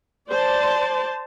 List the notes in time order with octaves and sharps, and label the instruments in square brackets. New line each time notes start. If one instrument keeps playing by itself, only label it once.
[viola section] C5 D5 A5